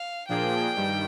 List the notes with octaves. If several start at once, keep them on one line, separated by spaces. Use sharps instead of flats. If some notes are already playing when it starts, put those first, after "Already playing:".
Already playing: F5
A#2 F3 A#3 D4 G#4 G5
G2 D#3 G3